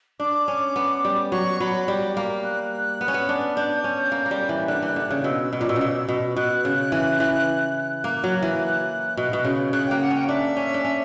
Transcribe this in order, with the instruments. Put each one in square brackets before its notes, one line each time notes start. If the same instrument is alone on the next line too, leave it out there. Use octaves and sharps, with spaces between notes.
[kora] D4 [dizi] D6
[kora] C#4
B3
G3
[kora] F#3 [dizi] C#6
[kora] F#3 [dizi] B5
[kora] G3
A#3
[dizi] F#6
[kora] B3
C#4
B3
D4
[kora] D4 [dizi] G6
[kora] C#4
A#3
A#3
G3
E3
[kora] D3 [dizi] F#6
[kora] E3
D3
C#3
[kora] B2 [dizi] E6
[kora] B2
A#2
B2
C#3
B2
B2
[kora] B2 [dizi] F#6
[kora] C#3
E3
E3
[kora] A#3 [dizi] F#6
[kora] F#3
E3
B2
B2
C#3
[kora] C#3 [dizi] F#6
[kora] A#3 [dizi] G5
[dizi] F#5
[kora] C#4 [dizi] G5
[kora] D4 [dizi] E5
[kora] C#4
D4
C#4